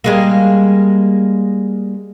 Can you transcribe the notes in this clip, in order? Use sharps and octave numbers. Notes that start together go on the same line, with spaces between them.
G3 G#3 A#3